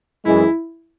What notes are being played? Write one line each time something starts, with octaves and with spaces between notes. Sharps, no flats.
F#2 E3 G#3 E4